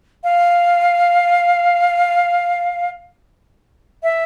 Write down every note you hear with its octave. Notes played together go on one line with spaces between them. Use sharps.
F5
E5